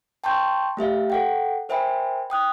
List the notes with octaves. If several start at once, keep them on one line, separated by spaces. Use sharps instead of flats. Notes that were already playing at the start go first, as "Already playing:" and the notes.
G5 A5 C6 C#6 G6
A3 G4 E5 F5
A4 F#5 G5
A#4 C5 E5 G5 G#5 B5
G5 D#6 F#6